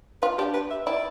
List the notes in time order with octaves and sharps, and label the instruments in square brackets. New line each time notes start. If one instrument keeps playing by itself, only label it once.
[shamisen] F4 [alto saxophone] B4
[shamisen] D4 [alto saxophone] G4
[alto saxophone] B4
E5
[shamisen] E4 [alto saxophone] D5